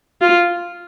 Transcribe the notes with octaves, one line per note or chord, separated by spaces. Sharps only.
F4